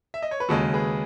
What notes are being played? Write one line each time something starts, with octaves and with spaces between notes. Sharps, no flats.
E5
D#5
C#5
B4
D#2 C#3 G#3 F#4 A4
G#4 B4